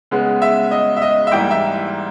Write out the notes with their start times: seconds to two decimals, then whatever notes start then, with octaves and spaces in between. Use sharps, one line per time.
0.11 C#3 G#3 B3
0.42 E5
0.71 D#5
0.96 E5
1.02 D#5
1.27 E5
1.31 G#2 E3 G3 A#3 G5
1.51 E5